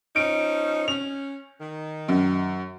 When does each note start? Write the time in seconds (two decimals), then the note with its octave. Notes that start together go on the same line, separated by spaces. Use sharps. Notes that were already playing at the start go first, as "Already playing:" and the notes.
0.16 F3 C#4 D#4 D7
0.88 C#4 F7
1.61 D#3
2.08 F#2